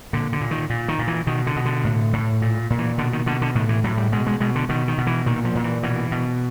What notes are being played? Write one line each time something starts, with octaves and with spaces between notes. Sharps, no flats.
A#2 D3
D3
A#2
D#3
A#2
D#3
A#2
E3
B2 D#3
D3
B2
D3
A2
A2
A#2
A#2
E3
B2 D3
D#3
B2 D3
D3
A2 D#3
E3
A2 F#3
G3
B2 G#3
G#3
B2 G#3
D3
B2 D#3
D#3
B2
E3
A#2 D#3
F3
A#2
E3
B2 E3
B2